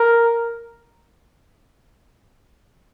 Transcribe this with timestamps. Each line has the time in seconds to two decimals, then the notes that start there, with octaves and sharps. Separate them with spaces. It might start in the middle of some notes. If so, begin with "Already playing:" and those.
Already playing: A#4